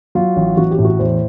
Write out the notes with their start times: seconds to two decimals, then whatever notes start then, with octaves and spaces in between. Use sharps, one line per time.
0.15 F#3 F4
0.36 A1
0.57 A1 F#4
0.71 G4
0.78 A2
0.85 F#4
0.99 E2 C5